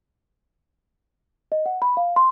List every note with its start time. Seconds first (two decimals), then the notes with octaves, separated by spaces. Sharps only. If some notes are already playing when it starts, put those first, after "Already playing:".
1.52 D#5
1.66 F#5
1.82 B5
1.97 F5
2.16 C6